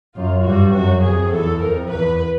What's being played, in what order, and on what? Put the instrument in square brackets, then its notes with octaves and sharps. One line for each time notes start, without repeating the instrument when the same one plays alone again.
[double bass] F#2 [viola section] F4
[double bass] G2 [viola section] F#4
[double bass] F#2 [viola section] F#4
[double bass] F2 [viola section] G#4
[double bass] E2 [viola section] A4
[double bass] F2 [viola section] A#4
[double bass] E2 [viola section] B4